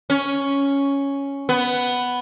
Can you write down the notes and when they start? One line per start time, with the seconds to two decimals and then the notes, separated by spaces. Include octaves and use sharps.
0.10 C#4
1.49 B3